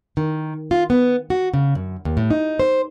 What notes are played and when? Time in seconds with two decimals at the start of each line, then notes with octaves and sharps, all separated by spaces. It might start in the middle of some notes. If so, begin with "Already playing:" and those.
0.17 D#3
0.71 F4
0.90 B3
1.30 F#4
1.54 C#3
1.75 F#2
2.05 D#2
2.17 A2
2.30 D#4
2.59 C5